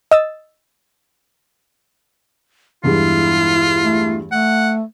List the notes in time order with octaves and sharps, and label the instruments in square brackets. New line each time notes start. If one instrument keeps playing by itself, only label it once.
[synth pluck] D#5 E6 A6
[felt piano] E2 G2 G#3 [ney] E4 [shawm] F4
[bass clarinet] A3
[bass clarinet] A3 [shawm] F#5